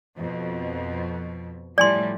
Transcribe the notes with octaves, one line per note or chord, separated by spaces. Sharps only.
F2 B2
A2 F3 G3 D5 G#5 C6